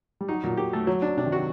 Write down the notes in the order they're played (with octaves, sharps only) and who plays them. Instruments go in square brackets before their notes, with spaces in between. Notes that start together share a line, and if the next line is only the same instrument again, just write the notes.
[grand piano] G3
[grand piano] F#3 [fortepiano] D#4
[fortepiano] A#2 [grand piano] F#3
[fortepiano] G4
A3
F#3
D4
[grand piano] C3 [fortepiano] D4
[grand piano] D#3
[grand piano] F#3 [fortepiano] F#4